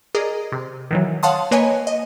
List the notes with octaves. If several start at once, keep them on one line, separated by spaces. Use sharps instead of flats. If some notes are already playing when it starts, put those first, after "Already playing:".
G#4 A#4 D5 D#5
C3
D#3 E3 F#3
C#5 F5 F#5 A5 C6 D#6
A#3 B4 C#5 D#5 G#5
D#5